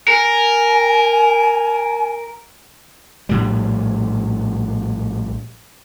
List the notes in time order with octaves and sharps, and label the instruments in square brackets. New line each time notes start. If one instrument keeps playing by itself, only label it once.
[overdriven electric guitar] A#4 [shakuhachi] G#5
[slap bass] A#1 A2 G3